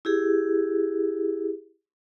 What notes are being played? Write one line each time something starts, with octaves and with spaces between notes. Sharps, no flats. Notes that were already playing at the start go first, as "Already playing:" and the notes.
E4 G4 G#4